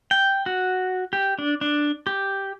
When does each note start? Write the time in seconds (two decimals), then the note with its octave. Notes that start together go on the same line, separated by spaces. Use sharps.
0.11 G5
0.46 F#4
1.13 G4
1.39 D4
1.61 D4
2.07 G4